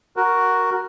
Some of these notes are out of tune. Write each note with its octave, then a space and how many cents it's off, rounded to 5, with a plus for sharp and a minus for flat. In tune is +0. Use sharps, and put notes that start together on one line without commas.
F#4 +0 A#4 +0